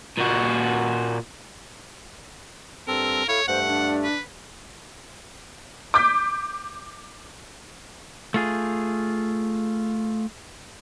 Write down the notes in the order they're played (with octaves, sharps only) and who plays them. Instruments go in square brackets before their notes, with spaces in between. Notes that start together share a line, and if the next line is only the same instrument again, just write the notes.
[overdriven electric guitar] A#2 F#4
[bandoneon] G2 C4 A4 [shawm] A#4
[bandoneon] E4 F5 [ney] A4 [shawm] C#5
[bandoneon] G2 A3 [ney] C5 [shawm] F#5
[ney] D4
[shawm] B4
[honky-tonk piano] D6 G6 B6
[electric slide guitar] A3 F4 G#4